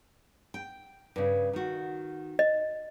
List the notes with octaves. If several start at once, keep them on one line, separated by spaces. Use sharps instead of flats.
G5
G2 C#3
D#3 F#4
D#5